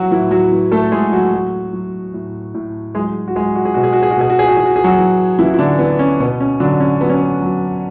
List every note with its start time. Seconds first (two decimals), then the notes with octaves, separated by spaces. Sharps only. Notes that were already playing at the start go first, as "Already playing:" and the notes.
Already playing: E3 F#3 F#4
0.11 A2 E3 E4
0.31 F#3 F#4
0.52 E3
0.71 A3 A4
0.92 A2 G#3 G#4
1.12 F#3 F#4
1.33 F#3
1.73 F#3
2.14 A2
2.54 A2
2.95 F#3 G#3 G#4
3.28 F#4
3.36 F#3 G#3 G#4
3.56 F#4
3.65 G#4
3.74 B2 F#4
3.83 G#4
3.93 F#4
4.03 G#4
4.11 F#4
4.17 B2 G#4
4.30 F#4
4.39 G#4
4.48 F#4
4.57 E3 G#4
4.66 F#4
4.76 G#4
4.84 F#3 F#4
4.98 E3
5.38 C#3 E3 E4
5.54 E4
5.59 D3 D4
5.79 E3 B3
5.99 C#4
6.20 B2 B3
6.40 C#4
6.60 D3 F#3 D4
6.80 C#4
7.01 F#3 B3
7.09 C#4
7.17 B3
7.42 F#3